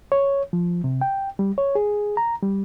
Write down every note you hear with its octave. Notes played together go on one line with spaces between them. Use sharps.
C#5
F3
C3
G5
G3
C#5
G#4
A#5
G3